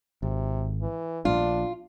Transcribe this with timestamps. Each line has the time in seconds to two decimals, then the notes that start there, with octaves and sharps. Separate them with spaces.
0.23 G#1 C3
0.82 E3
1.25 A#1 D4 F4